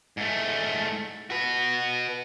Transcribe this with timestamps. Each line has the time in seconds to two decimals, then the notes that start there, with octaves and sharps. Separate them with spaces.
0.17 G#2 A3
1.30 F#4 B4